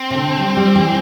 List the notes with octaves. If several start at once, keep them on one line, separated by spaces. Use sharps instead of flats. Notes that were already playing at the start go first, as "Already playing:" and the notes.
Already playing: C4
C3
D3
G3
G3
E3